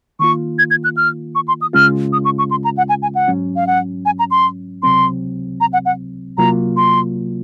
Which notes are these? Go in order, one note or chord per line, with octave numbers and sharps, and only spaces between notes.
D#3 A#3 F4 C#6
G#6
G#6
F#6
F6
C#6
C6
D#6
C#2 C#3 G#3 C#4 F4 F6
D#6
C#6
C#6
C6
A#5
F#5
G#5
G#5
F#5
G#2 F#3 C#4
F5
F#5
G#5
A#5
C6
C#2 C3 F#3 C4 C6
A#5
F#5
F#5
C2 C3 F#3 A#3 F4 A#5
C6